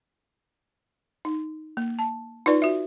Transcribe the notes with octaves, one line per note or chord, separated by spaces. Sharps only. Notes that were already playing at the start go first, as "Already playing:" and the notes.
D#4
A#3
A5
D#4 F4 B4 D5
F#4 E5